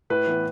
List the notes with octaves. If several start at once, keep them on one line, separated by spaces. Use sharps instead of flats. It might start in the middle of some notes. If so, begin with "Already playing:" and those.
A2 B4
E3 B3